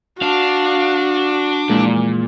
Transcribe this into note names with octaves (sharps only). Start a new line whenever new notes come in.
D4 F#4 F5
F2 A#2 E3 G#3